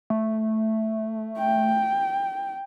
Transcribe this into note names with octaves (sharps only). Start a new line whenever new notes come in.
A3
G5